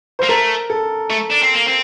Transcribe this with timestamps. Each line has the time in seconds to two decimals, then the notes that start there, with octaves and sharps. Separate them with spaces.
0.19 A#3 C5
0.29 A3 A#4
0.70 A4
1.10 A3
1.30 D4
1.42 C4
1.54 A#3
1.66 C4